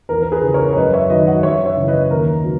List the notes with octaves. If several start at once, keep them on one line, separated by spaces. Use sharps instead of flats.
E2 A#4
A#4
G#4 B4
C#3 E3
A#4 C#5
C#5
F#2 B4 D#5
C#5 E5
D#3 F#3 B4 D#5
D#5 F#5
F#2 C#5 E5
C#5 E5
C#3 E3
B4 D#5
D#2 A#4
C#3 F#3